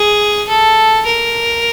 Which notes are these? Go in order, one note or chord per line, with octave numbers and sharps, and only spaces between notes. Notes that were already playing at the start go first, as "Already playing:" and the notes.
Already playing: G#4
A4
A#4